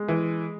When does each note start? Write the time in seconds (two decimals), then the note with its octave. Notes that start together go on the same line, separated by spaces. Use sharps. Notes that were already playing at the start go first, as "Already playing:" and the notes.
Already playing: G#3
0.08 E3